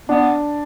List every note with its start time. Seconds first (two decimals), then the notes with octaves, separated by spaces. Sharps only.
0.09 B3 D4